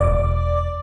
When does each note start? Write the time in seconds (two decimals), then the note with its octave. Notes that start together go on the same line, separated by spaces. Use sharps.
0.01 E1 D5 D6